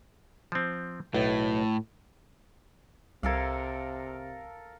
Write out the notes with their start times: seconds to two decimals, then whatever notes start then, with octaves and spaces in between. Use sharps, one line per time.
0.52 F3 C4
1.14 B1 A2 A3
3.23 C2 C3 A4 A#4 F5 G#6